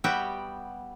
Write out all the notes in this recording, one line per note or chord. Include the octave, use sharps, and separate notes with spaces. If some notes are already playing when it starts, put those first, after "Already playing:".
G3 B3 F#4 G4 E5 G5